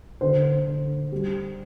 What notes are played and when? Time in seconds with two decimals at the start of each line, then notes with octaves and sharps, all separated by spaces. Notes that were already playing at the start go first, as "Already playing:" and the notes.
0.21 D3 C5
0.67 D3
1.12 G3